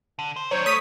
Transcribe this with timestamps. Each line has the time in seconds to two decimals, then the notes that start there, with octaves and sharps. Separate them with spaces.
0.19 D3
0.36 C5
0.51 F#3 D4 C5 C#5
0.66 A3 C#6 D#6 B6 D#7